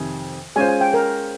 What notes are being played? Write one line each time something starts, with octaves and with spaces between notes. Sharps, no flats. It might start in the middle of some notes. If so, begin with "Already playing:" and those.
Already playing: F2 C3 D#3 G#5
G#3 C#4 F4 C5 G#5
G#5
G5
A#4